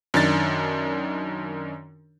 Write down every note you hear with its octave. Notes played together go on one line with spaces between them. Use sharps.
F#2 D#3 D4 A6